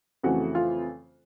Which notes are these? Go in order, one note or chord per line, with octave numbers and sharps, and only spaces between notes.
F2 C#3 E3 A3 F#4
F4